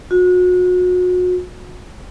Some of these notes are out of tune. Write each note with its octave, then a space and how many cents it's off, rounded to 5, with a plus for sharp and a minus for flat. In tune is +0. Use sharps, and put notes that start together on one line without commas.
F#4 -35